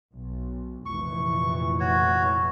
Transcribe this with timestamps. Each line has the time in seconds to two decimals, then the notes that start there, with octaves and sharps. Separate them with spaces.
0.15 B1
0.86 F1 A#2 E3 C#6
1.80 F#4 C#5